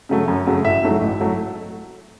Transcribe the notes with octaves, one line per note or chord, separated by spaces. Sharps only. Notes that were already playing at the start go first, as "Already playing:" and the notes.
C#3 F#3 A3
F#2
C#3 F#3 A3
A1 E5
G#2 F#3 A3
A1
F#3 A3